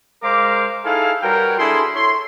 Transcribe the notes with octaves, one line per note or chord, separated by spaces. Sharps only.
G#3 A#4 C5 F5 D6
D#4 E4 G#4 A4 F5
G3 F#4 A#4 B4 C#5 G5
D4 E4 G#4 A4 C6
E4 A4 C#5 C6